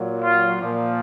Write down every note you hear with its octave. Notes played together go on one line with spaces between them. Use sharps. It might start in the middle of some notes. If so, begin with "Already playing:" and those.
Already playing: A#2 F#3
F4
A#2 F3